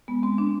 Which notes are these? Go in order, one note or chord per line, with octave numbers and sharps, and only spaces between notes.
G#3 B3
G#3 C4
G#3 D4